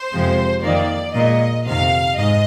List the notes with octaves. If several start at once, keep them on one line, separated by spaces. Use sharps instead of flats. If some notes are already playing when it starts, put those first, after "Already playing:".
Already playing: C5
F2 C3 F3 G#3
F2 D#3 A#3 D5
A#2 G#3 D#5
F2 C3 D#3 F5
G#2 D#5